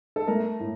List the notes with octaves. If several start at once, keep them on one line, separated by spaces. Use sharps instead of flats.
A4
A3 A#4
A2